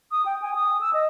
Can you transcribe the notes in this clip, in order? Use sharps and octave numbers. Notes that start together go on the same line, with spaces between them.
D#6
G5
G#5
D#6
E6
D#5